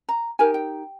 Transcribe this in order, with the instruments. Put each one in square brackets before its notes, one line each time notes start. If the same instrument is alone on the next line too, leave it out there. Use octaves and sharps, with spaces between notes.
[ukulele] A#5
D#4 G4 A#4 G#5
G5